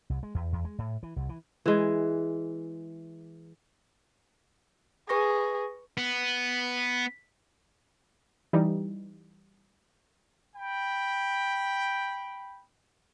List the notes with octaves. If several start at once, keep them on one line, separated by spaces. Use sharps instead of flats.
C2
G#3
E2
E2
G#3
A2
E3
C2
E3
E3 G#3
G#4 B4 C#6 A#6
B3
E3 G3 D#4
G5 B5